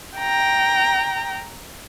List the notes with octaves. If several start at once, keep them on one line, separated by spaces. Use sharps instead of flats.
G5 A#5